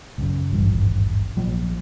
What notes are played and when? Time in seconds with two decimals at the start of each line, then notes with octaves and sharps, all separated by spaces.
0.18 C#2 F#2
0.52 D#1 G#1 G2 E3
1.37 A#1 F3 F#3 A#3